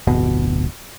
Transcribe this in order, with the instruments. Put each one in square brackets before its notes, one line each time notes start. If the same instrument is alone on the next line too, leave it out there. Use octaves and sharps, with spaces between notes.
[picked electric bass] D1 G1 B2